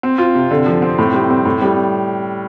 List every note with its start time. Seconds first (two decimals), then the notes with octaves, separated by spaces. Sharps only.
0.03 C4
0.18 F4
0.35 C3
0.51 D3
0.66 F3
0.82 C4
0.98 A2
1.14 G3
1.30 C4
1.45 A2
1.62 G3